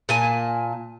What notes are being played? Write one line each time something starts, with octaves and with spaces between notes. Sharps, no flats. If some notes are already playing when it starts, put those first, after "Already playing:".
A#2 G#5 A5